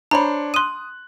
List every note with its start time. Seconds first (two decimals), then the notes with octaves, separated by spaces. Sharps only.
0.11 D4 C5 C#5 A#5 B5
0.54 C6 D#6 F#6 D#7